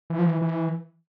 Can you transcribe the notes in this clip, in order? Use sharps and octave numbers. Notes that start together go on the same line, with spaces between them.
E3
F3
E3
E3